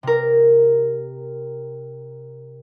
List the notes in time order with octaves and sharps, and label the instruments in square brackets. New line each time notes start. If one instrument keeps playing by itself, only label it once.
[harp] C3 A#4